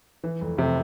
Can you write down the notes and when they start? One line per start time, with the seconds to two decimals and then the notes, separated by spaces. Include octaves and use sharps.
0.24 E3
0.41 F1
0.57 F1 C3